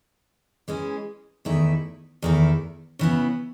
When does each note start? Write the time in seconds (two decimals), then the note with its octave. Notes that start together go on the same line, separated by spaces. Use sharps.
0.68 E3 G#3 C#4
1.45 E2 D#3 A3 E4
2.22 E2 D#3 A3 E4
2.99 C#3 E3 B3